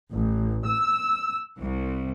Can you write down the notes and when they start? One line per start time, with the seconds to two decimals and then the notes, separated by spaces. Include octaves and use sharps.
0.13 A1
0.66 E6
1.60 C2